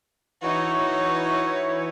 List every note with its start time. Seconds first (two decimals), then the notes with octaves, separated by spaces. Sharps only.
0.41 E3 D#4 E4 F#4 C#5